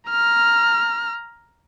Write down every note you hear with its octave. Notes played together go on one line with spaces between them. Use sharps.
A#5 F6